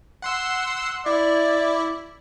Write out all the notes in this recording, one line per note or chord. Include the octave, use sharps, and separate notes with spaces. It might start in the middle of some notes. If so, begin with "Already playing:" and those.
F#5 C6 E6
E4 D5